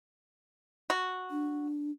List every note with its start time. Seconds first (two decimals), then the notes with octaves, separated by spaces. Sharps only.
0.90 F#4
1.31 D4